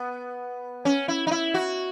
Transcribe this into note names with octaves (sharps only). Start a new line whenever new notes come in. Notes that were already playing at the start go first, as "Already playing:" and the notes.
Already playing: B3
C#4
E4
D#4
E4
F#4